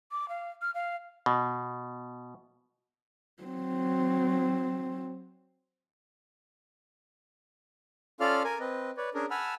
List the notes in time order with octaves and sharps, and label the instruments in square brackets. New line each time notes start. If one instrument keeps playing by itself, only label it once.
[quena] D6
F5
F6
F5
[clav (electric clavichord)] B2
[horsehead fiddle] F#3 C4
[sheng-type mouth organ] C#4 F4 A4 D5 F5 F6
A#4 G#5
C4 B4 D#5
B4 C#5 D5
C#4 D4 G#4 A#4
F#5 G#5 A5 B5 E6 F6